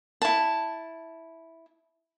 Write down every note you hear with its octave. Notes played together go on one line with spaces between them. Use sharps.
E4 A5